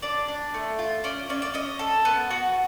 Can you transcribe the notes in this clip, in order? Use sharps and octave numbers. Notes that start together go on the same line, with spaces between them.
D4 D5
D4
A3
F4
C#4 D5
C#4 D5
D5
C#4 D#5
A4
B3
F#4